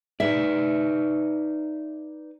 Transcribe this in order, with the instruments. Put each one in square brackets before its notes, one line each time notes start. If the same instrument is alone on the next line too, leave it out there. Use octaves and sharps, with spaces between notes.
[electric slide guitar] D#4 B4 D5 [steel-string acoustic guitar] E5